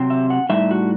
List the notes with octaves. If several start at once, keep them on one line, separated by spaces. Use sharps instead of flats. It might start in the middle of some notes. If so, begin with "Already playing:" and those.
Already playing: C3 F#3 C4
E5
F#5
A2 G3 D#4 E5
F#4